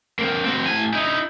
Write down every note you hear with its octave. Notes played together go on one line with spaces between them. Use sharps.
A#3 C4
C4 F#4
A2 G#5
D#4 E4